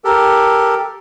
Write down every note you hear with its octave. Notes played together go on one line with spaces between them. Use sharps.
G4 A4 A#4